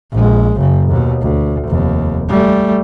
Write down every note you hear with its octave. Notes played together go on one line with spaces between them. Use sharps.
A#1 G#3
F#1 C#3
D#2 B2
D2
F1 D#2
G3 A3